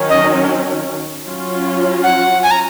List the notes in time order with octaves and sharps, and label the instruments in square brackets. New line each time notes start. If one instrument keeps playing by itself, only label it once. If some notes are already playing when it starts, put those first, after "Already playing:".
Already playing: [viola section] D#3 F#3 C#4
[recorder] D#5
[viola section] F#3 C#4 F4
[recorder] F#5
G#5
A#5